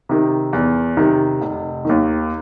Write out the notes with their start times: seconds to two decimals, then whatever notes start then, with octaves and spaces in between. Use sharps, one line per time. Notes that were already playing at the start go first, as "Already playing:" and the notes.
0.09 C3 D#3
0.53 E2
0.97 C3 D#3
1.42 F1
1.85 D#2 D#3